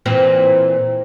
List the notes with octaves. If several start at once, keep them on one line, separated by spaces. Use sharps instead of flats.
A#2 E3 C4